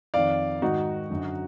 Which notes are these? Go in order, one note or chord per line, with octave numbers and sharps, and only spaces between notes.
F2 D#3 D5 F5
G#2 D#3 D#4 F#4
F#2 D3